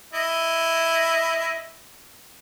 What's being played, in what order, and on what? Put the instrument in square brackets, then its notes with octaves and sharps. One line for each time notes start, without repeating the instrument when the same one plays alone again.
[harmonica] E4 D#5